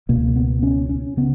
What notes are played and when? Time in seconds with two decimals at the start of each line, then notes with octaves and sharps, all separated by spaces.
0.09 C#2 B2 A#3
0.36 B3
0.63 C#4
0.89 C#4
1.17 C#3 B3